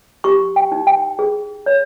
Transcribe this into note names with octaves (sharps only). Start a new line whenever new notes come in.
G4 C#6
G5
D#4
G5
G#4
C#5